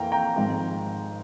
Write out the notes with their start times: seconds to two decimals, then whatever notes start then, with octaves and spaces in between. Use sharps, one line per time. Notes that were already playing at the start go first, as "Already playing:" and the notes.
Already playing: F2 E3 A#3 F5 G5 A#5
0.12 G5 A#5
0.36 G#1 G#2 F3